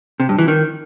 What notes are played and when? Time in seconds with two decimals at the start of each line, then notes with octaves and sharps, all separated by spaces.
0.20 C3
0.29 G2
0.39 E3
0.48 D#3